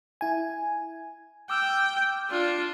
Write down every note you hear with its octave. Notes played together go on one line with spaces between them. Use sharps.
E4 G#5
G5 D6 E6 F6
D4 F4